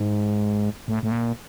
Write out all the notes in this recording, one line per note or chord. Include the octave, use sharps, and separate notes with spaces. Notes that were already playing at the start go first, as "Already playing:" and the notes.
Already playing: G#2
A2
A2
A#2